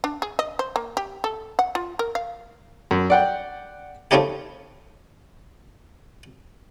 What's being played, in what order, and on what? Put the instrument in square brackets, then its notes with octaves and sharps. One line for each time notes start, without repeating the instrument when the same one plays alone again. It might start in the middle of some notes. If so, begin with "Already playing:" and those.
[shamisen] D4
G#4
D#5
C5
A#3
G4
A4
F#5
F4
A#4
F5
[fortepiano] F#2
D5 F#5 G5
[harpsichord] F3 G3 A3 C#4 D#4 G4